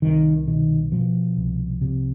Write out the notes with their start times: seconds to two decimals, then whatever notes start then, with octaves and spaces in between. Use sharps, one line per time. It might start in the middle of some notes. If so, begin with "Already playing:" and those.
0.02 C2 D#3
0.48 B2 D#3
0.92 B2 F3
1.37 C2
1.81 C3